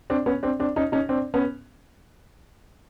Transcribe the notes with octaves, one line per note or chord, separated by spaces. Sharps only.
C4 D4
B3 C#4
C4 D4
C4 D4
C#4 D#4
C#4 D#4
C4 D4
B3 C#4